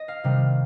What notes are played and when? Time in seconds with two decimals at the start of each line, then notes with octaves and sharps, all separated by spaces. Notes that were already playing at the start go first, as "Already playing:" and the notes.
Already playing: D#5
0.08 F5
0.24 C3 D#3 G3